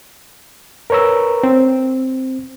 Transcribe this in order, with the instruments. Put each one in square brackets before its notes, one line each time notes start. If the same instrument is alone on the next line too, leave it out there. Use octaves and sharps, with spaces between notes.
[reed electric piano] A#4 B4 C#5 A#5 E6
C4